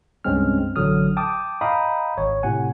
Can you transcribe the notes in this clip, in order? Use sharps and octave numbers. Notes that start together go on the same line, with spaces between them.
C2 G2 G#3 C4 C#4 F6
A1 D3 F#3 D#6 F6
G5 A5 D6 D#6
D#5 F5 G5 A#5 B5 D#6
G#1 C#5
A2 C3 F#5 G#5